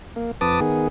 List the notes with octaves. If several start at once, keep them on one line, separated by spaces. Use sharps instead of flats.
A#3
F2 B4 A5 D6 D#6
D#3 B3 G#4